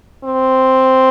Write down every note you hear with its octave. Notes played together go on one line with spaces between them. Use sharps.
C4